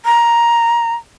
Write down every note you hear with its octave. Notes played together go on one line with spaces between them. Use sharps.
A#5